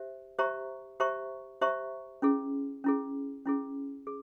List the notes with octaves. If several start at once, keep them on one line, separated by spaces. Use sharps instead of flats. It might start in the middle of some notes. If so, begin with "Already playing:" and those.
Already playing: G4 C5 E5
G4 C5 E5 A#5 C#6
G4 C5 E5 A#5 C#6
G4 C5 E5 A#5 C#6
C#4 E4 G#4
C#4 E4 G#4
C#4 E4 G#4
G#4